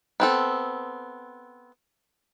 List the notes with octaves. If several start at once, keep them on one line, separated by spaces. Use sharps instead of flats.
B3 C4 A4